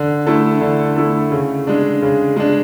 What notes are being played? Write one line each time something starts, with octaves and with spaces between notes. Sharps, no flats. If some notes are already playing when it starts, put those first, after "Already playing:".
Already playing: D3
A3 E4 A4
D3
A3 E4 A4
C#3
G#3 D4
C#3
G#3 D4